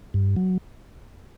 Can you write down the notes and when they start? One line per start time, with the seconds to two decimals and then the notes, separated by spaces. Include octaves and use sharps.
0.14 G2
0.36 F#3